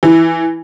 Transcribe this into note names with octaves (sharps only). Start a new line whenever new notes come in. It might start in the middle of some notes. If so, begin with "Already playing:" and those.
E3